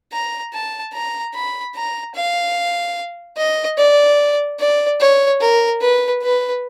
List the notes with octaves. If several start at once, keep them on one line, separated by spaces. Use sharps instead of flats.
A#5
A5
A#5
B5
A#5
F5
D#5
D5
D5
C#5
A#4
B4
B4